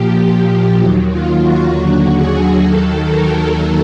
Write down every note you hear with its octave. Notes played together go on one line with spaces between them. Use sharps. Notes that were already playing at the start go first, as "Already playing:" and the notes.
Already playing: A#2 F3 G4
D#2 D#3 F#3
F4
F#4
D#2 D3 F#3 F#4
G#4
D#2 D#3 F#3 A4
A#4